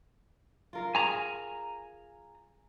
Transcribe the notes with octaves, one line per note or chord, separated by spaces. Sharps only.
F4 A#4 F5
G#4 G#5 A#5